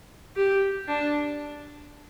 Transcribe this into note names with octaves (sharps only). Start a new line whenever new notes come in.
G4
D4